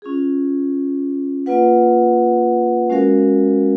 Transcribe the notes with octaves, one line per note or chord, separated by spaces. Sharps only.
C#4 F4 G#4
A#3 F4 B4 F#5
G#3 C#4 F#4 A#4 F5